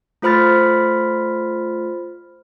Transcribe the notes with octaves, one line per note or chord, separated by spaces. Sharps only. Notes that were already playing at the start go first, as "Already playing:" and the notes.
A3 F4 C5 B5 F6 A6